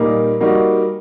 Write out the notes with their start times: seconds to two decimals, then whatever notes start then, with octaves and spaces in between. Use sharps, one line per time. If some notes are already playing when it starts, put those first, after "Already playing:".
Already playing: A#2 G3 A#3 D#4
0.40 G3 A#3 D#4 F#4